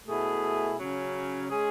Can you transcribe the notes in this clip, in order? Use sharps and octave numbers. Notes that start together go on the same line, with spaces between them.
B2 A3 E4 G#4
C#3 F#3 C#4
G#3 C#4 G#4